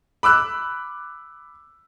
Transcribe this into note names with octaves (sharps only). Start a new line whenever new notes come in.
B5 D6 E6 F#6